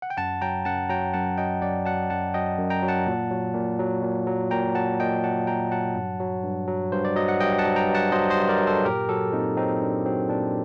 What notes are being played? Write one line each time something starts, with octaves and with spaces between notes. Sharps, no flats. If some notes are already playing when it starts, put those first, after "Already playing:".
F#5
G5
F#2 F#5 A5
F#3 G5 A#5
F#2 F#5 A5
F#3 G5 A#5
F#2 F#5 A5
F#3 D#5 G5
F#2 D5 F#5
F#3 F#5 A5
F#2 F#5 A5
F#3 D#5 G5
F#2
G5 A#5
F#3
F#5 A5
A#2
F#3
A#2
F#3
A#2
F#3
A#2 G5 A#5
F#3 F#5 A5
A#2 D#5 G5
F#3 F#5 A5
A#2 G5 A#5
F#3 F#5 A5
G2
F#3
G2
F#3
G2 C5
D5
F#3 D#5
F#5
G2 D#5 G5
F#5 A5
F#3
G5 A#5
G2
F#5 A5
F#3 C5 D#5
C5 D#5
G2
A#4 D5
F#3
A4 C5
A#2 G4 A#4
F#3 F#4 A4
A#2 C4 D#4
F#3 C4 D#4
A#2 D4
F#3 C4
A#2 D4